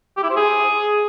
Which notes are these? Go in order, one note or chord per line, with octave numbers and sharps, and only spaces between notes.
G4
E4
C5
G#4